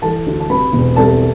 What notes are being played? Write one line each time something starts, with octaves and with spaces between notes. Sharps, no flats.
E3 A4 A5
D2
A5
C3 B4 B5
E1
C2 A4 A5